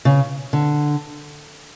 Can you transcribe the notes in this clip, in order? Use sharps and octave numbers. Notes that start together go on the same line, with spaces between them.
C#3
D3